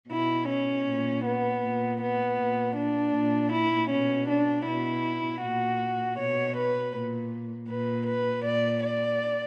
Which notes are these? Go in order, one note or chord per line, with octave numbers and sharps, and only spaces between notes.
B2 E4
C#4
A#2
B3
A#2
B3
A#2
D4
A#2
E4
B2 C#4
D4
B2 E4
A#2 F#4
B2 C#5
B4
A#2
A#2 B4
B4
A#2 D5
D5